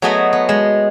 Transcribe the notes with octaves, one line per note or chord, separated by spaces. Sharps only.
F#3 A3 B3 F#4 G#4 D#5
B3
G#3